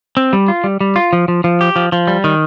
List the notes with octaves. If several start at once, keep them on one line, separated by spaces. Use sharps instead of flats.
C4
G3
F4
G3
G3
F4
F3
F3
F3
G4
F3
F3
G3
D#3